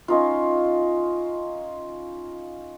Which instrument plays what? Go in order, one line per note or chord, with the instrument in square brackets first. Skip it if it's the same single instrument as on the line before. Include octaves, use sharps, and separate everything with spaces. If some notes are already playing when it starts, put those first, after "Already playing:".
[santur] C#4 D#4 F4